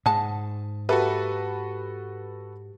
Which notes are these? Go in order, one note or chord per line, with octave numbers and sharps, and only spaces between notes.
G#2 G#3 F#5 A5
A#3 F#4 G4 A4 B4 E5